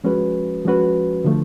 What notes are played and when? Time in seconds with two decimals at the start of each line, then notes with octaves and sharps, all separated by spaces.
0.04 F3 G#3 C#4 F#4 B4
0.65 F3 G#3 C#4 F#4 B4
1.24 D3 F3 A3